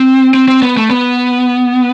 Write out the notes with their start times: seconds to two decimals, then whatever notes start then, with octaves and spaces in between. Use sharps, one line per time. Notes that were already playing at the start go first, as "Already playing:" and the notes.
Already playing: C4
0.34 C4
0.48 C4
0.62 B3
0.77 A3
0.90 B3